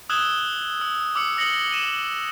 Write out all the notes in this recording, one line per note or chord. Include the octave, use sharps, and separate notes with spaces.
D#6 E6 F#6 G#6 E7 G7
E6
D6 E6 C#7
D#6 E6 A#6 C#7 F#7 G7
D#7 E7 F#7